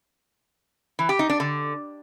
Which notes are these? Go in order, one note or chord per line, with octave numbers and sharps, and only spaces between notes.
E3
G4
D#4
D4
D3